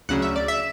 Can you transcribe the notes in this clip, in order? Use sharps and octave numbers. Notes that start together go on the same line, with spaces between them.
D2 C#3 F#3 F#5
E5
D5
E5